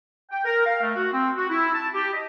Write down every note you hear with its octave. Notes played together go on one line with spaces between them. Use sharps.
G5
A#4
F5
A3
F#4
C4
F#4
E4
A5
G4
D#5